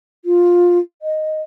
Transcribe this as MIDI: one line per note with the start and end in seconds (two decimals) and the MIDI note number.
0.25 0.78 65
1.02 1.41 75